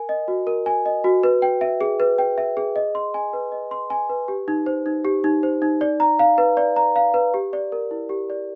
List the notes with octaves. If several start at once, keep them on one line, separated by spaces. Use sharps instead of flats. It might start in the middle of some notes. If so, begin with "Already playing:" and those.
Already playing: A#4 G#5
D#5
F#4
A#4
G#5
D#5
F#4
B4
G5
E5
G#4
B4
G5
E5
G#4
D#5
C6
G#5
B4
D#5
C6
G#5
B4
G4
D#4
C5
D#4
G4
D#4
C5
D#4
D5
A#5
F5
B4
D5
A#5
F5
B4
G4
D5
A#4
E4
G4
D5